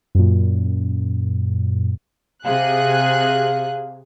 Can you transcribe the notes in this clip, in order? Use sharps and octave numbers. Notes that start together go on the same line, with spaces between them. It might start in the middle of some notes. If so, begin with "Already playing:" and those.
F#2 A#2
C3 G#4 F5 F#6